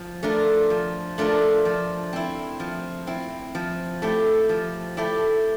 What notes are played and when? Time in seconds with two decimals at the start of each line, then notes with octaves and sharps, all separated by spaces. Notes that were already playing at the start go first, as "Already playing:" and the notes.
Already playing: F3
0.23 A3 D4 F4 A#4
0.70 F3
1.18 A3 D4 F4 A#4
1.65 F3
2.13 C4 E4
2.60 F3
3.07 C4 E4
3.55 F3
4.02 A3 E4 G4
4.49 F3
4.97 A3 E4 G4